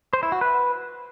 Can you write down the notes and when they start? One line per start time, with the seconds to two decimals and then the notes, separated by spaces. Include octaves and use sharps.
0.13 C5
0.23 E4
0.32 F#4
0.41 B4